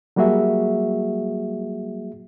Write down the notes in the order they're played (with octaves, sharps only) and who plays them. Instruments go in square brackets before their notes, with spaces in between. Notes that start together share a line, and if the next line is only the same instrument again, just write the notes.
[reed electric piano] F#3 G3 A#3 F#4 G#4 E5